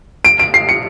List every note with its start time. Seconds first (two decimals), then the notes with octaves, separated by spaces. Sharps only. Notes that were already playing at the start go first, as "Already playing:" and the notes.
0.25 D7
0.39 D7
0.54 C7
0.69 C#7